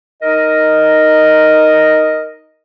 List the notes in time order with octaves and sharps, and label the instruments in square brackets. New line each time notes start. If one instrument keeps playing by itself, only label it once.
[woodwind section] D#4 A#4 D#5